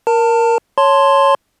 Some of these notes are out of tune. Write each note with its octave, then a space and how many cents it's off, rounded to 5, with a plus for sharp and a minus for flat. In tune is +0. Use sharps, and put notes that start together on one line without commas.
A#4 +5 A5 +30
C#5 +0 A5 +0 C6 +0